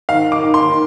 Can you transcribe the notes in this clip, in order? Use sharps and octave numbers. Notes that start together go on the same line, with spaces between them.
D#3 F5
D6
D#3
C6
D#3